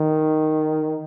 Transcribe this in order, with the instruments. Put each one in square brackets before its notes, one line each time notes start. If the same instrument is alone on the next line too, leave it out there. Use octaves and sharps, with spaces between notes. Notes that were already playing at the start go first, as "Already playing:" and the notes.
Already playing: [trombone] D#3